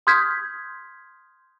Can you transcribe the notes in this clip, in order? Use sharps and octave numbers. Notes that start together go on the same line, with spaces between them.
C6 D#6 F6 G6 G#6 B6